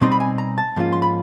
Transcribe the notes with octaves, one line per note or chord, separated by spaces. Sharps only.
B2 G3 C4 D#4 C6
B5
G#5
A#5
A5
G#2 F3 A#3 C#4 F4
C6
B5